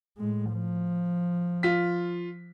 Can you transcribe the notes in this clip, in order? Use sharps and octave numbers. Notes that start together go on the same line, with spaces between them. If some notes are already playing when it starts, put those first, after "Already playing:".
A2 G#3
F3
F4 B6